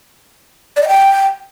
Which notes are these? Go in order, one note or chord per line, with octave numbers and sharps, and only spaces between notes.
D5
D#5
G5